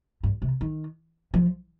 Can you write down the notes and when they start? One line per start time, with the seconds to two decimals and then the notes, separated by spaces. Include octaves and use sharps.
0.23 G2
0.42 C3
0.61 D#3
1.34 F3